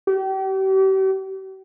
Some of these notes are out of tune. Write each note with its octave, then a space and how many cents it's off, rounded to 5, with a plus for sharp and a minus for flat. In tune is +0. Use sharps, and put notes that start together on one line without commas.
G4 -40